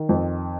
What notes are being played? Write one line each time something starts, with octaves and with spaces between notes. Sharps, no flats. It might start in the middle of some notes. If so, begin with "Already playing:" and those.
Already playing: D#3
F2